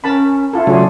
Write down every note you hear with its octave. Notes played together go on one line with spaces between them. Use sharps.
C#4 A#4 A5 B5
E4 F4 A4
C#3 F#3 A3 D4 F4 G#4